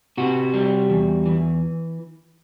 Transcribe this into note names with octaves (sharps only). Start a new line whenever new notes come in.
C3 F#4
G3
E2
E3